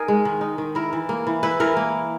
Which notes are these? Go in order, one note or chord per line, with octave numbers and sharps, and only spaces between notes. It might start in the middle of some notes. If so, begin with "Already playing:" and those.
Already playing: D#4 G#4 A#4
G#3
D#3
D#4
D#3
E4 A#4
E3
A#3
E3
E4 B4
E3 A#4
A#3